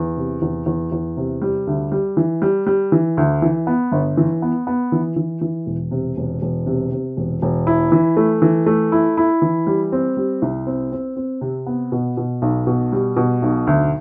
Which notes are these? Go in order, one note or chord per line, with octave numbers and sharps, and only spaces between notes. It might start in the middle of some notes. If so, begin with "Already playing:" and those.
Already playing: E2
C3
E2
E2
E2
C3
G3
D2
G3
E3
G3
G3
E3
D2
E3
B3
G1
E3
B3
B3
E3
E3
E3
E1
C3
E1
E1
C3
C3
E1
E1
E4
E3
A3
E3
A3
E4
E4
E3
G3
C4
G3
C2
C4
C4
C4
C3
B3
B2
B2
B1
B2
G3
B2
B1
D2